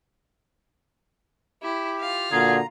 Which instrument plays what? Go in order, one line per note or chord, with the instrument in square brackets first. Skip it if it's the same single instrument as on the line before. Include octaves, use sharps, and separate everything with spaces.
[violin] E4 [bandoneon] G4
[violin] F4 F5
[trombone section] A#2 D3 F#4 [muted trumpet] G#4 [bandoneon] A#5